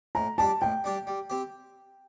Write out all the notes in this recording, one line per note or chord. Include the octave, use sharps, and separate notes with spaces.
A2 A#5
G3 D4 G4 A5
A2 G5
G3 D4 G4
G3
C4 G4